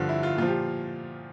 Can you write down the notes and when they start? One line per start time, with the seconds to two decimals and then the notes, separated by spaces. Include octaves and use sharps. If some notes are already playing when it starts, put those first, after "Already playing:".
Already playing: G2 D3 F3 F4
0.09 E4
0.23 F4
0.37 A#2 F3 F4
0.48 G4